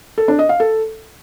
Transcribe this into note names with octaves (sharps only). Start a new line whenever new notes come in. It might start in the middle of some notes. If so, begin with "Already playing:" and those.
A4
D4
D#5
F5
A4